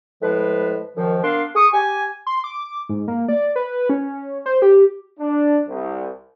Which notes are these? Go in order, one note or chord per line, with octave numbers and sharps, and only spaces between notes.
A2 F3 G#3 B4
F#2 B2 D#3 F3
A#3 B3 D4 F5 C6
G#4 C#6 D#6
G4 G#5
C6
D6
G#2
A#3
D5
B4
C#4
C5
G4
D4
C2